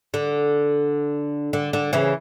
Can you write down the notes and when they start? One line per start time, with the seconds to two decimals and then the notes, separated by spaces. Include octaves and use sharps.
0.14 D3
1.53 D3
1.73 D3
1.93 C#3 E3